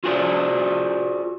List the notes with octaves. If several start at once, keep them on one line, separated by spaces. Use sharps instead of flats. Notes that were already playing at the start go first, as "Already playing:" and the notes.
F4 F#4 G#4 C5 D5